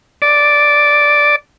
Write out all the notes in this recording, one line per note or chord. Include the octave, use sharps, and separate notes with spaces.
D5